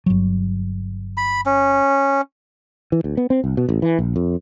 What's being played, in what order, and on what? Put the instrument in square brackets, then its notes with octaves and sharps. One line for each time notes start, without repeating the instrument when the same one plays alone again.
[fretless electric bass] G1 F#3
[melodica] B5
C#4
[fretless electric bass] E3
D2
B3
C4
C2
B2
A1
E3
A#1
F2